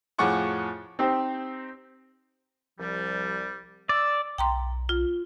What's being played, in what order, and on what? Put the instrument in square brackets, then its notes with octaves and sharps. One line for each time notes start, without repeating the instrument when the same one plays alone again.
[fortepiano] F2 A2 G#4 F#5 C#6 D6
[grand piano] C4 D#4 G4 C5
[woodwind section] C2 F3 G3
[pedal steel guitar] D5 [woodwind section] E6
[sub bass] B1 [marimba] G5 A#5 C6
[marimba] F4